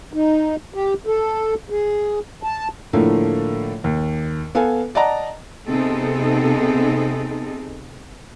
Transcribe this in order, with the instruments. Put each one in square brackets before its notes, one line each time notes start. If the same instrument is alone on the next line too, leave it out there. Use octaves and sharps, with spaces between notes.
[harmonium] D#4
G4
A4
G#4
A5
[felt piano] A2 D3 F3 A3 A#3
D#2
B3 A4 F5 G#5
D5 D#5 F#5 A5 A#5
[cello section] C3 B3 C4 D#4 G#4 A4